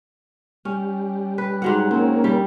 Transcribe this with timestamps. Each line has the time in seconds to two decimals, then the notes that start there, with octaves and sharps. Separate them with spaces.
0.65 G3 C#4
1.38 B4
1.62 G#2 F#3 F#5
1.91 A#3 C4 C#4
2.24 G3